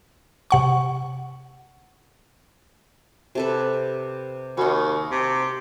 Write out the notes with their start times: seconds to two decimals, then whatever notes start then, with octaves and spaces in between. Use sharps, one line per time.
0.51 C3 F#5 C#6
3.35 C3 A4 B4
4.57 D#2 F#4 D#5
5.11 C3